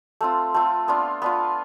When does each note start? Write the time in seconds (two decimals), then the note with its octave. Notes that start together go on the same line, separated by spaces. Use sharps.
0.21 A3 C4 F4
0.54 A3 C4 F4
0.88 B3 D4 F4
1.22 B3 D4 F4